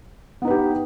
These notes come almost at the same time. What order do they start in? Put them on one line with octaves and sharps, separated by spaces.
B3 D#4 B4 G4